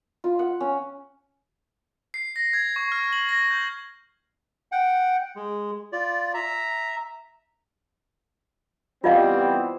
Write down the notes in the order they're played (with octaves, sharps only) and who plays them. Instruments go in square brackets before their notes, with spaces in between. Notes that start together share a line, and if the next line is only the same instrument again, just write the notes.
[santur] F4
F#5
C#4
[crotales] C7
A#6
G#6
C#6
F6
F#7
A#6
G6
[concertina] F#5 G5
G#3
F4 D5
E5 A#5
[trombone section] E3 B3 C4 [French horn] G3 [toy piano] F4 D#5 F5